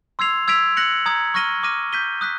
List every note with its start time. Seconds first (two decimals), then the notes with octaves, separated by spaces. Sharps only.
0.19 C6 E6 G#6 C7 F7
0.48 E6 G#6 B6 D7 F7
0.77 F#6 A#6 C#7 F#7
1.06 A#5 D#6 G#6
1.34 C#6 F6 A#6 D#7 G7
1.63 D6 F6 A#6 D#7
1.93 G6 B6 D#7 G7
2.21 D#6 F#6 B6